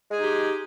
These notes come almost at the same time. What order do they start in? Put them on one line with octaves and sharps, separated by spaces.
G#3 G#4 D#4 G4